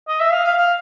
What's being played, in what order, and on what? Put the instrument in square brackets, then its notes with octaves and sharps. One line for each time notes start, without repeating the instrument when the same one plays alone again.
[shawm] D#5
E5
F5
F5
F5